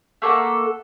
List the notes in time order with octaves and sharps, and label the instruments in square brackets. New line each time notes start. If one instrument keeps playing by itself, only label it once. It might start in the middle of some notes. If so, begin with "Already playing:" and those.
[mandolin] A3 A#3 A4 F#5